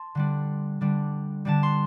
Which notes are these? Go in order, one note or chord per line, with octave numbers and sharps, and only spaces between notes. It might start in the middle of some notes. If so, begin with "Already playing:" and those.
Already playing: A5 C6
D3 G3 D4
D3 G3 D4
D3 G3 D4 A5
C6